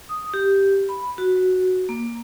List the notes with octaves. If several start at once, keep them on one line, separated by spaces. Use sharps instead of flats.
D#6
G4
B5
F#4
A#3